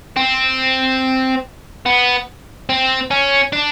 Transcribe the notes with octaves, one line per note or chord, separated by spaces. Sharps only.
C4
B3
C4
C#4
D4